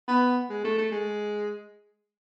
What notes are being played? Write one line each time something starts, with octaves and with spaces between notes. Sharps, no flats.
B3
G#3
A3
A3
G#3